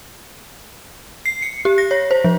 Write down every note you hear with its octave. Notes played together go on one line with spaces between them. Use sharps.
C7
C#7
G4
A#6
C#5
C5
F3